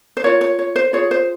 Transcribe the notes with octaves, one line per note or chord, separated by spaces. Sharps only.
C5
F4 A#4 C#5
C#5
C#5
C5
F4 G#4 C#5
C5